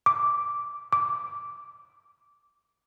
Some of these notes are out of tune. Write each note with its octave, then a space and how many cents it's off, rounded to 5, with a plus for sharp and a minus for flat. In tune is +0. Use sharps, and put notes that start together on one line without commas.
D6 -5
D6 -10